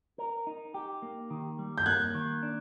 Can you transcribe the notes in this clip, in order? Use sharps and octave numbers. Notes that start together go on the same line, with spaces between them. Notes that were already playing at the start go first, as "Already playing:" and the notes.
A#4
D#4
G4
A#3
D#3
G3
G6
A#3 F#6 G#6
D#3
D4